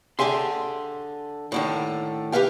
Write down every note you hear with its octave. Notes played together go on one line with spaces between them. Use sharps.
D3 G4 G#4 E5 C6
A2 D3 D#3
G4 B4 E5 F5 G5